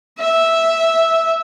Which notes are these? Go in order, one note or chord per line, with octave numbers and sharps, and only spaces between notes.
E5